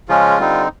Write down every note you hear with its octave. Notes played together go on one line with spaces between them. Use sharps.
C#3 F3 G#3 C#4 F4
D3 G3 C4 D#4